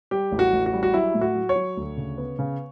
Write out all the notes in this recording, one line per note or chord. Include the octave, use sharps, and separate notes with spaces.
G3 G4
A1
F#4
A1
F#4
G3
F#4
F#3 E4
A2
F#4
F#3
C#5
F#3
D2
C#3
B3
C#3